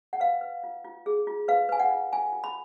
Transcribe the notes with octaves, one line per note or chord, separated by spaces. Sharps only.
F#5
B4 F5
B4
F4
F4
G#4
F4
B4 F5
B4 G#5
F#5
F4
F4 G#5
F4
B5